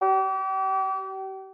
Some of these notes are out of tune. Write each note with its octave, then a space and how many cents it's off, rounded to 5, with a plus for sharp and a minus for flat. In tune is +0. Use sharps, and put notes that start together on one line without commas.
G4 -35